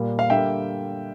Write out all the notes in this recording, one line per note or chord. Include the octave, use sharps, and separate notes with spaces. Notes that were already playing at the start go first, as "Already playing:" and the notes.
Already playing: A#2 G3 A#3
F5
D3 G3 A#3 E5 G5